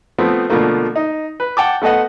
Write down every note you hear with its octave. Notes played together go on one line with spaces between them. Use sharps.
F3 A3 B3 C4
B2 D3 F3 A3 A#3
D#4
B4
F#5 G5 A5 D6
A3 B3 A4 D#5 F#5